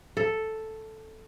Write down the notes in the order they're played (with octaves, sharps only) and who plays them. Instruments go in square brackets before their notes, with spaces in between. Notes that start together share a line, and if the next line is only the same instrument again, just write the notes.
[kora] A4